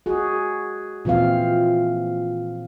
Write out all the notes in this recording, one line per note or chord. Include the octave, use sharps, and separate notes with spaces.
F#4 G#4
A#2 E3 C4 F5